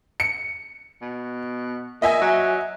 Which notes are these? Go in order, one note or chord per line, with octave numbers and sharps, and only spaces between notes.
C#7
B2
A#2 D#5 E5 G#5
F#3